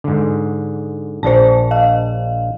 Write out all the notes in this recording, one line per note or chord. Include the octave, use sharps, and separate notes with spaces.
G#2 D3
A#1 D4 C5 A5
D#5 F5